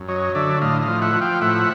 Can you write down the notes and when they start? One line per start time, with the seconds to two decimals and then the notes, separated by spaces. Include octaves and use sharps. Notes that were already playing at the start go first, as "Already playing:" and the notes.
Already playing: F#2
0.08 F#3 C#5 D#5
0.35 D3 D5 E5
0.61 A2 D#5 F5
0.82 D#5 F5
0.88 F3
1.01 E5 F#5
1.15 F3
1.21 F5 G5
1.41 A2 E5 F#5